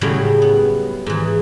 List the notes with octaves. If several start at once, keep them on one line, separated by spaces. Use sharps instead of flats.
A2 C#3 F#3 G3 E4
B3
G#2 E3